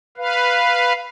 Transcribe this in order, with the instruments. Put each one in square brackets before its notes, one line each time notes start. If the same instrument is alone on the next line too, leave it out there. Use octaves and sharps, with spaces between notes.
[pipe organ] B4 F5